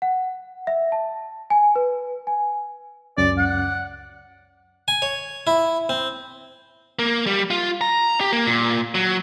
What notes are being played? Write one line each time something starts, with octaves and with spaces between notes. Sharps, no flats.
F#5
E5
A5
G#5
B4
G#5
C#2 F#2 C#4 D5
F#5
G#5
C#5
E4
C4
A#3
G3
F4
A#5
G4
A#3
A#2
F#3